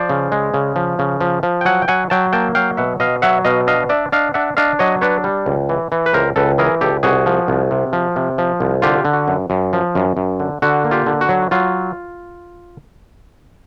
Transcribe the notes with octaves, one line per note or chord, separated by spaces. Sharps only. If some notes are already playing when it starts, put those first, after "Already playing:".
Already playing: F3 C5 D5
C#3
G#3
C#3
F3
C#3
F3
F3
G5
F#3 F#5 G#5
G5
F#3 F#5 G#5
F#3 G5 A5
A#3 G5 A5
F#3 F5 G5
B2 E5 F#5
B2 D#5 F5
F#3 E5 F#5
B2 D#5 F5
D4 D#5 F5
D4 D5 E5
D4 D#5 F5
D4 E5 F#5
D4 D#5 F5
F#3 C#5 D#5
D4 B4 C#5
G3
C#2
E3
E3
B4
C#2 A#4 C5
C#2 A4 B4
E3 G#4 A#4
C#2 G4 A4
C2 F#4 G#4
F3
C2
C3
F3
C3
F3
C2
D3 F4 G4
D3
F#4
F#2
F#2
F3
F#2
F#2
D3
D3 F#4
A#3
F4 G4
D3
F#4
F#3
F#3 F4